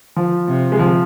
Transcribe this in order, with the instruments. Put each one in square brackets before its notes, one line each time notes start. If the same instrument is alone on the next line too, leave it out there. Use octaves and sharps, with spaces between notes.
[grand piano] F3
[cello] C3
[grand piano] G#3
F3